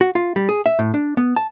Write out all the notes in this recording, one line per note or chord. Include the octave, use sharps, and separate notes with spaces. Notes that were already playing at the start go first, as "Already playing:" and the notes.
F#4
F4
G3
G#4
E5
A2
D4
B3
A5